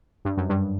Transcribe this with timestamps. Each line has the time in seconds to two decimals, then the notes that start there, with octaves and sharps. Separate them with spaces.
0.25 G2
0.37 F#2
0.49 G2